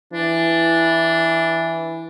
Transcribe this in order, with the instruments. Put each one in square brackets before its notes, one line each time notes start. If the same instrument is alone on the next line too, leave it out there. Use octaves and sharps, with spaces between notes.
[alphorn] E3 [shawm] D4